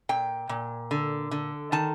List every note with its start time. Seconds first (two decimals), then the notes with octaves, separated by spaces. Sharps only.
0.09 A#2 G5
0.49 A#2
0.91 D3
1.31 D3
1.72 D#3 A5